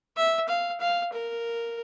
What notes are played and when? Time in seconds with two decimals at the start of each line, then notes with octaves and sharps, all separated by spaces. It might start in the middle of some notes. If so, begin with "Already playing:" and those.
0.17 E5
0.48 F5
0.80 F5
1.12 A#4